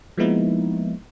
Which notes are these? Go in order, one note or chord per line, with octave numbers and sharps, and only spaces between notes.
F3 G#3 A#3 B3 D#4 E4